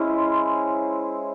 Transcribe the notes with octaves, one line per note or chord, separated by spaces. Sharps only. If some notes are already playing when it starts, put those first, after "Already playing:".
Already playing: G#3 C#4 E4 C5